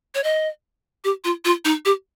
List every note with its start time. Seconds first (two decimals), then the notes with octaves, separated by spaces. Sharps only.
0.15 C#5
0.23 D#5
1.04 G4
1.24 F4
1.45 F4
1.65 D#4
1.85 G4